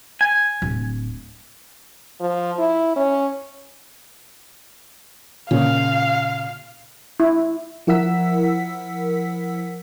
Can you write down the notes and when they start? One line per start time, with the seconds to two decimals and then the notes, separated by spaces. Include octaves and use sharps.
0.21 G#5
0.62 D1
2.20 F3
2.59 E4
2.96 C#4
5.51 A#2 C#3 F5
7.20 E4
7.87 F3 E4 A#4 F#5 E6 B6